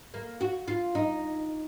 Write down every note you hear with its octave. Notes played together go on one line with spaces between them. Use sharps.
A#3
F#4
F4
D#4